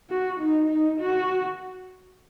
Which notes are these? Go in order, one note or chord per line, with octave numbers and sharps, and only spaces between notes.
F#4
D#4
D#4
F#4